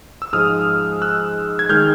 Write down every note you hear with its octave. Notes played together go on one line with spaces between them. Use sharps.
E6
G#2 F3 G#3 D#6 F6
E6 F#6
G#6
D#3 G#3 F6 G6